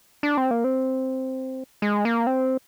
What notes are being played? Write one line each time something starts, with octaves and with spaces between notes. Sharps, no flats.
D4
C4
A#3
C4
G#3
A#3
C4